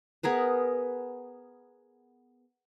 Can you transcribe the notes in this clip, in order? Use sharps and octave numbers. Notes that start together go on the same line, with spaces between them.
B3 G#4 A#4 B4